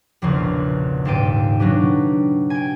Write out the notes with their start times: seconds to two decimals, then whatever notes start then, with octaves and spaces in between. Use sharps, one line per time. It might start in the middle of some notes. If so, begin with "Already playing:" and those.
0.22 E1 A#1 E2 C#3
1.05 D#1 G#2 A4 F5 G5 D#7
1.60 B2 F#3 D4 G4
2.50 G5 G#5